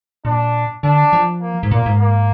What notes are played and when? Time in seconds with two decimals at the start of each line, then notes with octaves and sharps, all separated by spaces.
0.25 A#2 D4
0.83 D3 D4
1.13 F3
1.42 A#3
1.63 G#2
1.71 A#2 A#3
1.86 G#2
2.00 A#3